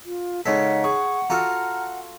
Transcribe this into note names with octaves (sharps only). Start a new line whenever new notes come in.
F4
C#3 G#3 D#4 A4 C#5 F#5 B6
G#4 C#6
F4 F#4 A4 A#5 F6